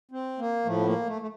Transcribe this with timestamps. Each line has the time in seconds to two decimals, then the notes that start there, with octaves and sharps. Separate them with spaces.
0.11 C4
0.39 A#3
0.65 A2 F3 A3
0.80 B3
0.86 A#3
1.07 A3
1.22 A3